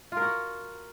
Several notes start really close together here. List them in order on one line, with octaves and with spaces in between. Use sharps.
F4 A#4 F#4